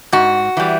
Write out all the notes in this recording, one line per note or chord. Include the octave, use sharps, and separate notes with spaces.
G#2 F#4
E3 G3